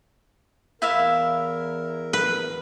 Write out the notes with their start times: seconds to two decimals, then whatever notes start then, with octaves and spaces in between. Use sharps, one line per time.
0.82 E2 E4 A#4 E5 F5
2.13 B4